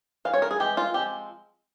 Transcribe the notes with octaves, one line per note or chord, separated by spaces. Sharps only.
E3 G3 F5
C#5
A#4
G#4
E3 G#3 C4 G4
F4
F3 G#3 C4 G4